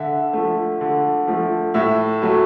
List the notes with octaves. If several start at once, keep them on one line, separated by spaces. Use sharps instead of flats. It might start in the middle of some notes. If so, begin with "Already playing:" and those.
Already playing: D3 E5
F3 A3
D3
F3 A3
A2 E5
F#3 A3